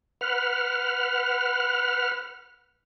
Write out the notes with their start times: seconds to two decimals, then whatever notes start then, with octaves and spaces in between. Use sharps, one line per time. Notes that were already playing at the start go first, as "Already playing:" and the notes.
0.21 B4 F#5 F6